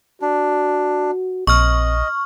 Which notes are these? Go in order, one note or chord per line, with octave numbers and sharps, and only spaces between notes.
D4 F#4
A#1 C4 D#5 C#6 F6